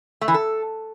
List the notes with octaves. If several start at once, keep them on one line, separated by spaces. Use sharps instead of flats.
A3
E3
A4